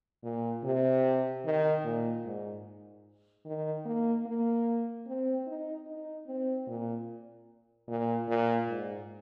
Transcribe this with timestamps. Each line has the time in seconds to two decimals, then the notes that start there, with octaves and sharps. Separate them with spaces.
0.23 A#2
0.64 C3
1.45 D#3
1.84 A#2
2.26 G#2
3.45 D#3
3.85 A#3
4.26 A#3
5.07 C4
5.46 D#4
5.87 D#4
6.27 C4
6.67 A#2
7.88 A#2
8.28 A#2
8.68 G#2